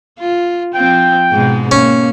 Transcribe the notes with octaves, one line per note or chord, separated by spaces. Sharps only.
F4
F3 C4 F4 G5
G#2 B2 G#3
A#3 C#4